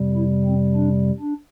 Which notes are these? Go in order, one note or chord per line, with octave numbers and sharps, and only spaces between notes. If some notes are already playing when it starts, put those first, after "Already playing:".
Already playing: F2 C3 G3
E4
C4
D4
D4